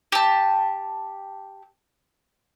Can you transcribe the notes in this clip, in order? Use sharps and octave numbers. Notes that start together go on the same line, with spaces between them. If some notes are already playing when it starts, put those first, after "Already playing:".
G4 A5